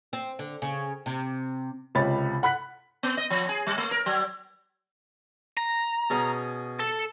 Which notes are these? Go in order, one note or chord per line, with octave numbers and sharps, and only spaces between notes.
C4
D3
C#3
C3
C#2 C3 C#5 B5 A6
F#5 B5 F#6 B6
B3
D#5
F3
G#4
G3
A3
A#4
F#3
A#5
B2 C#4 G#4
A4